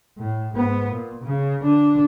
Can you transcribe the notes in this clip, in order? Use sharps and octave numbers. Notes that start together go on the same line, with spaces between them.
A2
G#2 B3
A#2
C#3
D3 D4